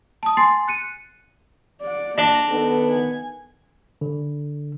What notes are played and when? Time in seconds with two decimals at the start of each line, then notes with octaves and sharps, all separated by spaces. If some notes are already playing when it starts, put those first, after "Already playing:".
0.23 A5 D#6
0.37 G#5 C6 A6 C7
0.68 F#6 C#7 D#7
1.82 D5 F#5
2.18 A#3 D4 A#5
2.51 D#3 B3 D#4 A4
2.89 G#5
4.01 D3